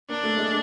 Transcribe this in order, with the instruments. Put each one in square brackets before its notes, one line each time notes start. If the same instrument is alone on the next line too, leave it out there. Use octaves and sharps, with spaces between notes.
[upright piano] A#3 [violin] D4
[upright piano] A3
G#3